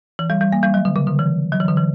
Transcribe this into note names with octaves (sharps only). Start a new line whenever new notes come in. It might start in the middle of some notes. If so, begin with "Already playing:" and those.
E3
G3
G3
A#3
G3
F#3
D3
C#3
D3
E3
F#3
E3
D3
E3